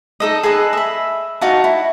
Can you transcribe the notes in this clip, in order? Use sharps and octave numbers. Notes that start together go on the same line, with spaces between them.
D#4 A4 D#5
G#4 A4 B4 D#5
E5 B5
D#4 F#4 F5 A5
E4